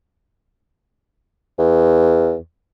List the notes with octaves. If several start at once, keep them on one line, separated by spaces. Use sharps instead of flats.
E2